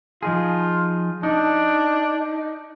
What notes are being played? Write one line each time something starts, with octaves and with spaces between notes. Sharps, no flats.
F3 D#4 F4 G#4
D4 D#4